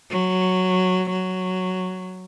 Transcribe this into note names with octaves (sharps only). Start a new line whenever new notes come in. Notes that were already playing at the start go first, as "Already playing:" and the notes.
F#3
F#3